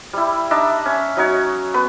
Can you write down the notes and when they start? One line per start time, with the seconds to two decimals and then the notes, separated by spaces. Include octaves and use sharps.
0.13 G3 E4
0.51 D4 D#4 D5 E5
0.85 C#4
1.17 F#3 D#4 F#4 C#5
1.74 B3 B4